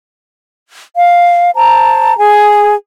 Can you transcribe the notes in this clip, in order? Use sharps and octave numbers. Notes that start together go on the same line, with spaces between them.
F5
C5 A5 A#5
G#4 G#5